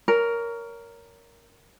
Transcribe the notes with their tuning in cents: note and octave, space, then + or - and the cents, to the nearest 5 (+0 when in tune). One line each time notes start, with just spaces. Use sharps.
A#4 +0 C#5 +25